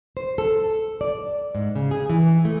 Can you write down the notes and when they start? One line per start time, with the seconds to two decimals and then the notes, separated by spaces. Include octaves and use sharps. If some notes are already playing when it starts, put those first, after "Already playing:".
0.17 C5
0.38 A4
1.01 D5
1.55 G#2
1.76 C#3
1.91 G#4
2.10 E3
2.45 A3